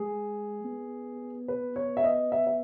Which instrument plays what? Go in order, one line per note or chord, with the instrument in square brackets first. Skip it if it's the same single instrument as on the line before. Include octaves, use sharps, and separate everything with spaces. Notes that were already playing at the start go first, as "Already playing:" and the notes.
Already playing: [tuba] G#3 [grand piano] G#4
[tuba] B3
[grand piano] B4
C#5
E5
D#5
E5
E5